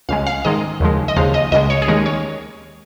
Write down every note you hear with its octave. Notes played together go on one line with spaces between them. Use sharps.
C#2 C#3 G#3 F5
F5
G#2 D#3 G#3 D#5
D#2 C#3 F3 G#3
D#5
D#2 C#3 F3 G#3 F5
D#5
C#2 C#3 G#3 D#5
C#5
G#4
D#2 D#3 G#3 A#4
C#5